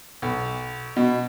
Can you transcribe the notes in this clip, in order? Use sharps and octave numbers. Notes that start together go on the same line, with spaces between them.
B1
B2